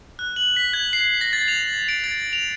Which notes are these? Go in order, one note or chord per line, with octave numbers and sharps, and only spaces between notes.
F#6
F#7
B6
G#6
C7
A#6
A6
F7
D7
A6
F7